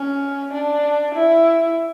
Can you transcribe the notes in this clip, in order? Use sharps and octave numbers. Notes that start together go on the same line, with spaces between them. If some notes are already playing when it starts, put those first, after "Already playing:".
Already playing: C#4
D4
E4